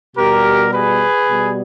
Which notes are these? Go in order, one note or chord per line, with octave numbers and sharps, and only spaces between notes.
B2 G3 G4 A#4
G#4 B4
B2 G3